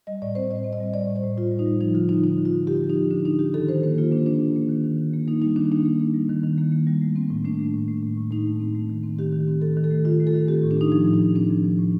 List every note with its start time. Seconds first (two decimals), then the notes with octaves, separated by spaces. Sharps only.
0.07 G3 D#5
0.22 A2 D5
0.35 C4 C5
0.50 A2 D#5
0.64 C4
0.73 D#5
0.80 G3
0.93 G3 D5
1.08 A2
1.16 C5
1.23 A2
1.37 A2 F4
1.51 G3
1.59 D#4
1.66 G3
1.81 F3 D#4
1.94 D3 F4
2.09 D3 D#4
2.24 D3 D#4
2.38 D3
2.45 F4
2.53 D3
2.67 D3 G4
2.82 F3
2.90 D#4
2.96 D3
3.11 D3 D4
3.25 D3 D#4
3.39 D3 G4
3.54 D#3 A4
3.68 D#3 C5
3.83 A#3 C5
3.98 A#3 F4
4.12 A#3 D4
4.26 A#3 D4
4.40 A#3
4.56 A#3
4.69 D#3
4.84 D#3
4.98 D#3
5.13 A#3
5.28 A#3 D#4
5.42 G3 D#4
5.56 D#3 D4
5.72 A#3 D#4
5.86 A#3
6.00 A#3
6.14 G3
6.29 D#3
6.44 D#3
6.58 A#3
6.72 A#3
6.87 G3
7.01 A3
7.16 C4
7.30 A2
7.45 A3 D4
7.59 A3
7.74 A2
7.88 A3
8.03 A2
8.17 A2
8.31 A2 D#4
8.46 A3
8.60 C4
8.75 A3
8.90 D#3
9.03 C4
9.19 D#3 G4
9.33 D#3
9.48 C4
9.62 D#3 A4
9.77 D#3
9.84 A4
9.91 A3
10.05 D#3 F4
10.20 A3
10.27 A4
10.34 D#3
10.48 C4 G4
10.64 A2
10.71 D4
10.77 A2 D#4
10.92 F3 D#4
11.06 A2
11.14 D#4
11.21 F3
11.35 C4 D4
11.50 F3
11.64 F3
11.78 A2